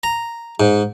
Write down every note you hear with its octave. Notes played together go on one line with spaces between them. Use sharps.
A#5
G#2